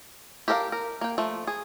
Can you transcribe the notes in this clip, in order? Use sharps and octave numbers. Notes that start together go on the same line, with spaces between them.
G4 A4 A#4 E5 F5
A#4
A#3 G5
F3 A3
G#4